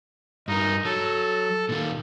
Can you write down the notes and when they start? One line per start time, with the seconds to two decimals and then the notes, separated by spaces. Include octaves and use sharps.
0.48 G2 D#4 A#4
0.85 F#3 A4
1.69 A#2 D#3 A#3